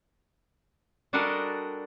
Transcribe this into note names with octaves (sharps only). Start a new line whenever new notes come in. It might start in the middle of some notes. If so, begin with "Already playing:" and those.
G3 D4 F#4 A4 A#4 D#5